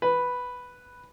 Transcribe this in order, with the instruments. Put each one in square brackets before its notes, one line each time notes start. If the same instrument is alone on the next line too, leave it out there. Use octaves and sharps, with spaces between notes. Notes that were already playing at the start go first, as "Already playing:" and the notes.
[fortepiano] B4